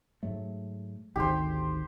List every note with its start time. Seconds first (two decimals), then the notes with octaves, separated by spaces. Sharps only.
0.23 G#2 F#3 A3
1.16 G#1 D2 D#3 G4 C5